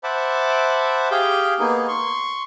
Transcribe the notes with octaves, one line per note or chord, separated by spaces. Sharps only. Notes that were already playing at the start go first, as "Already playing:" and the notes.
C5 E5 F#5 A5 B5 D6
G4 G#4 F5 G5
A#3 B3 D#4 G#4
C6 C#6